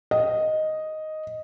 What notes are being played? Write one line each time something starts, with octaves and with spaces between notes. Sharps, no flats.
D#5